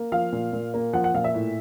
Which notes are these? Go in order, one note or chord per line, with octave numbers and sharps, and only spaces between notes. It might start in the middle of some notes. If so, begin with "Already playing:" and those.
Already playing: A#3
F3 F5
A#2
A#2
A#3
F3 F#5
F#5
A#2 F5
E5
A2